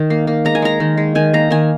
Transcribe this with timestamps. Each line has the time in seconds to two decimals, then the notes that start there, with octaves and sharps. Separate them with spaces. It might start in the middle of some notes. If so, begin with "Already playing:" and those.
Already playing: D#3
0.10 A#3
0.27 A#3
0.45 G#3 A#5
0.55 G#5
0.62 G#3 A#5
0.80 D#3
0.97 G#3
1.15 D#3 G#5
1.34 A#3 A#5
1.50 D#3 G#5